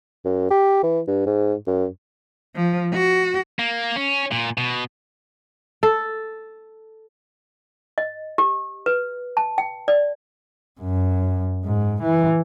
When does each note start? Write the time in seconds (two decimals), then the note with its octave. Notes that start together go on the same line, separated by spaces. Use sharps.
0.25 F#2
0.51 G4
0.83 E3
1.07 G2
1.26 G#2
1.67 F#2
2.55 F3
2.93 F#4
3.59 A#3
3.96 C#4
4.32 A#2
4.58 B2
5.83 A4
7.98 D#5
8.38 G4
8.86 B4
9.37 A5
9.58 G5
9.88 D5
10.81 F#2
11.65 G#2
12.02 E3